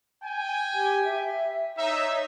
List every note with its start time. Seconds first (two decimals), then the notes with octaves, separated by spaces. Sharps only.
0.22 G5 G#5
0.73 G4
1.04 E5
1.77 D#4 C#5 E5